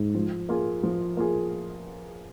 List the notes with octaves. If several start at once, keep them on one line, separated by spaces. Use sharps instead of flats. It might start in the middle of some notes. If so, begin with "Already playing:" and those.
Already playing: G#2
F3
A#3 F4 G#4
F3
A#3 F4 G#4